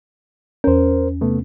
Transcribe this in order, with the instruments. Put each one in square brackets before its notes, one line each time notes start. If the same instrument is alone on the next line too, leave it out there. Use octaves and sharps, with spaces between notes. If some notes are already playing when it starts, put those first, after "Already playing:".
[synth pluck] E2 C#4 [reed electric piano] A#4 C5
[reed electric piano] C3 A3 B3